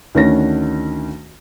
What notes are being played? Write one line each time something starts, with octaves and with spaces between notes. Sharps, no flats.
D2 D#3 C#4 D4 C#5 A#6